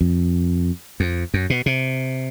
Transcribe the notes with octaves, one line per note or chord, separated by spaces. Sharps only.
F2
F2
F#2
B2
C3